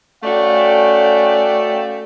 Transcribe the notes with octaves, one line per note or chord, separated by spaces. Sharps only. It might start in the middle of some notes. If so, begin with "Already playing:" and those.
A3 C#4 F#4 D5 F5 G5